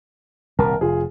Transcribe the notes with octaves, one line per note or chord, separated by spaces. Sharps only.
D#1 C2 C3 A#4 A5
F1 F4 G#4